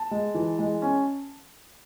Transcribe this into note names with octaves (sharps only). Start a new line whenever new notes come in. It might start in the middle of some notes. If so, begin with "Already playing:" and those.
Already playing: A5
G#3
E3
G#3
C#4